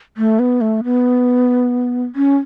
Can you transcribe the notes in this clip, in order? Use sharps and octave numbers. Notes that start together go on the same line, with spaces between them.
A3
B3
A3
B3
C#4